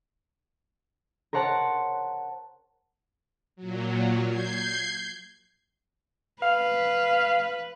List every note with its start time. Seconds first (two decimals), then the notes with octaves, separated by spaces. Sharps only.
1.33 A#4 C5 C#5 F#5 A5
3.56 A#2 F#3
4.29 G6 G#6 C7
6.43 B4 F5